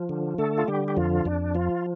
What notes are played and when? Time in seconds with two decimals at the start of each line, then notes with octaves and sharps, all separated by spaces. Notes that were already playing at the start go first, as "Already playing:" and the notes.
Already playing: F3
0.09 D3
0.38 D3 A3 A4
0.58 F4
0.68 D3 G3 G4
0.88 G4
0.97 F2 F3 F4
1.25 F2 D4
1.55 F3 F4